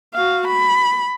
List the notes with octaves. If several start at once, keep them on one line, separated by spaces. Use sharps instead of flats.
F#4 F5
B5